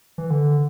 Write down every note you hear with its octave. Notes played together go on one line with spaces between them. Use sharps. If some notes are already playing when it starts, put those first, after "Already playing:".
E3
D3